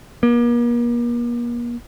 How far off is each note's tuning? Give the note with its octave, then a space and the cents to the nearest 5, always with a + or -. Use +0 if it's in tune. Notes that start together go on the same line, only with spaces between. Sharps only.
A#3 +40